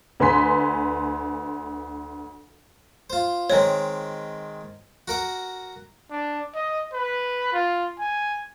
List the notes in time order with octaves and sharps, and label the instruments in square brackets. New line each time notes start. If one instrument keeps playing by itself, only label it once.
[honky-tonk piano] D2 B4 G#5 C6 B6
[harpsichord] F4 C5
[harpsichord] D#3 G#3 C4 [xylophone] C#5
[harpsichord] F#4 A#4 F#5
[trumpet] D4
D#5
B4
F4
G#5